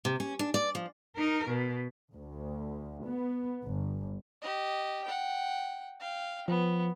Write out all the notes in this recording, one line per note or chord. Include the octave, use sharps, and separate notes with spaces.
C3
C#4
D4
D5
F3
D#4 A#4
B2
D2
B3
G1
G4 D#5
F#5 G5
F5 G5
F3 B3